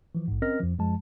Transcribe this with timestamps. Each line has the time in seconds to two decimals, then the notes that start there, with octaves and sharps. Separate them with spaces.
0.15 E3 F3
0.28 A#1 G#2
0.42 C4 C#4 A#4 D#5 F6 A#6
0.60 F2 F3
0.79 F#2 F3 G#3 A5